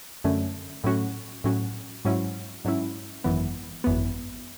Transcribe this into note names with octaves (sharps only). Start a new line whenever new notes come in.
F#2 D3 A3 C#4
A2 F#3 C#4 F#4
A2 F#3 C#4 F#4
G#2 F#3 C#4 E4
G#2 F#3 C#4 E4
G#1 F#2 E3 B3
G#1 F#2 E3 B3